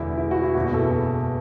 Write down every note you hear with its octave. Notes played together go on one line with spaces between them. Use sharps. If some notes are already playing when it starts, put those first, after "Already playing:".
Already playing: E1 E2 D3 E4
E4
F#4
E4
F#1 E2 B2 F#4
A4